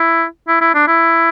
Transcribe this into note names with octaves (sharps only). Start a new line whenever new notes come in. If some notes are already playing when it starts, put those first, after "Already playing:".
Already playing: E4
E4
E4
D4
E4